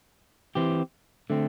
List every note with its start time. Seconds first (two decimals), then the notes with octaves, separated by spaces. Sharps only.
0.55 E3 C4 G4
1.30 D3 A3 C4